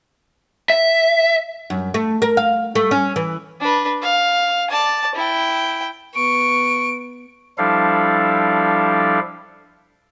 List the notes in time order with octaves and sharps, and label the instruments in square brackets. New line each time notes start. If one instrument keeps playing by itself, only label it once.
[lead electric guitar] E5
[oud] F#2
A3
A#4
F5
A3
C#4
E3
[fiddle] D4 B4
F5
D5 A5
E4 G5
[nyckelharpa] B3 [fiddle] C#6 [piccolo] D7
[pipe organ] F3 G3 D4 E4 A4 F5